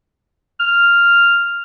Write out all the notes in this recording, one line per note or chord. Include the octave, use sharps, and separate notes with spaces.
F6